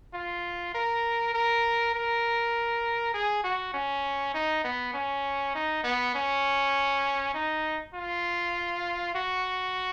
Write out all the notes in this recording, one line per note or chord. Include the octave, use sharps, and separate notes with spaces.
F4
A#4
A#4
A#4
G#4
F#4
C#4
D#4
B3
C#4
D#4
B3
C#4
D#4
F4
F#4